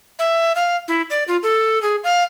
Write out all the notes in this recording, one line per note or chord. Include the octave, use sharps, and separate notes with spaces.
E5
F5
E4
D5
F4
A4
G#4
F5